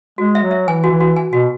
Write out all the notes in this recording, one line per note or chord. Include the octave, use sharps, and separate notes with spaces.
G#3 F#4
E5
F#3
E5
E3 G#5
F#4
E3
F#4
G#5
B2 F#4